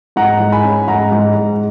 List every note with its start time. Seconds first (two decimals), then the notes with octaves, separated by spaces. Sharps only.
0.16 G#2 F#5 A#5
0.40 G#2
0.52 G#5 B5
0.64 C#4
0.88 G#2 F#5 A#5
1.12 G#2
1.35 G#2